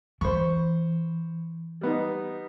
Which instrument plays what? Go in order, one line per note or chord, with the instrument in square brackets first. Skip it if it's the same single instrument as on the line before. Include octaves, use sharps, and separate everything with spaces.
[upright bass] E3 [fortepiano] C5 B5 C#6
[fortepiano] G3 B3 D#4